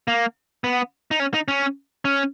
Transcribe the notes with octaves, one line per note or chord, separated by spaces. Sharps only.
A#3
B3
D#4
C#4
D#4
C#4
C#4